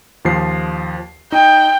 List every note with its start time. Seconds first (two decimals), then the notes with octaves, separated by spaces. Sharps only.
0.25 D#2 F3 C7
1.32 D#4 G5